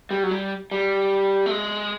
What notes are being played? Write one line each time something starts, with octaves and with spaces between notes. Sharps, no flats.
G3
F#3
G3
G3
A3
G#3